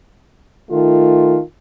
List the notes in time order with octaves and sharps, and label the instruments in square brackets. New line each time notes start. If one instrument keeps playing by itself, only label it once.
[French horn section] D#3 A3 F4